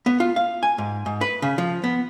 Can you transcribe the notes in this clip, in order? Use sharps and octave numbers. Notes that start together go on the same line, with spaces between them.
B3
F4
F5
G#5
G#2
G#2
B4
C#3
F3
B3